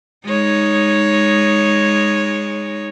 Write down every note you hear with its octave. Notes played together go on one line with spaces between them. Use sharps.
G#3 D#4 C#5